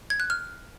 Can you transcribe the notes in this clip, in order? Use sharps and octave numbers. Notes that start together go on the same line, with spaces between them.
G#6
F#6
F6